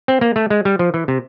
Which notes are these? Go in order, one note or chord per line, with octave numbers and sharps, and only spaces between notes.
C4
A#3
A3
G#3
G3
F3
E3
C3